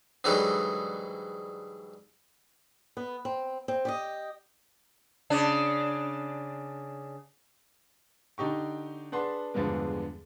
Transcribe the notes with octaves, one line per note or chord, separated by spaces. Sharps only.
G#2 D3 E3 F#3 G3 D#4
B3
C4
C4
G4 D5 D#5
C#3 D4
D3 D#4 G4 C#6
D4 G#4 B4 F#5 A5 C6
E2 G2 D3 F3 G#3 B3